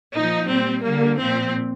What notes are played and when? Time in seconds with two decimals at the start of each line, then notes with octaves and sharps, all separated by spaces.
0.14 A#2 F3 D#4
0.49 A#2 G3 C4
0.83 D3 G3 A#3
1.18 A#2 F3 C4